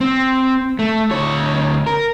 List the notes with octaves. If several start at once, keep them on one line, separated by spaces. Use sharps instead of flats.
C4
A3
D2 C#5
A#4